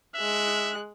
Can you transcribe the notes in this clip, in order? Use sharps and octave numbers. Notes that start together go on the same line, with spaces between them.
G#3 E5 F#6